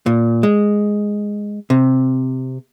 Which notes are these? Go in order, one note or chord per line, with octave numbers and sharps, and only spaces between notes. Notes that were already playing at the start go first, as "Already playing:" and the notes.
A#2
G#3
C3